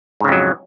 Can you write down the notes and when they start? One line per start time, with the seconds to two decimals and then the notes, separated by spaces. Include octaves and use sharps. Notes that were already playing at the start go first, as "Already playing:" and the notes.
0.20 G#2
0.24 C#3
0.28 F2
0.32 F#3